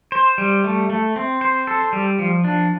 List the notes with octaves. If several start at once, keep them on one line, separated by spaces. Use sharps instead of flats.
C5
G3
A3
A3
C4
C5
A4
G3
F3
D4